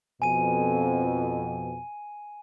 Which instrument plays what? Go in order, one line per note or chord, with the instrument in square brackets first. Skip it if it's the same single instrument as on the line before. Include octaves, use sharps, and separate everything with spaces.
[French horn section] F2 B2 [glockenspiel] G#5 D#7